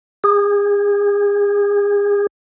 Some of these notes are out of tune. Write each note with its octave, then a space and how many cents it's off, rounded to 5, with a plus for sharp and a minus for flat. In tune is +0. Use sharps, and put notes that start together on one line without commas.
G#4 -35